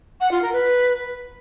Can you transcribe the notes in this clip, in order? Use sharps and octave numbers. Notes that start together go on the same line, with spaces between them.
F#5
F4
A#4
B4